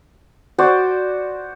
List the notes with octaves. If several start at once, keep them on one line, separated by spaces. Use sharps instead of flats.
F#4 C5 D5